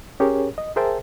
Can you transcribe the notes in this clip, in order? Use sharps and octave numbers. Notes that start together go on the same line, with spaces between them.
C#4 G4 G#4 A#4 C#5
D#5
G#4 A#4 C5 E5 G5 A5